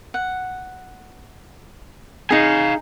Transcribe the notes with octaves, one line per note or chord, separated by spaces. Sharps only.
F#5
D#4 G#4 F5 G#5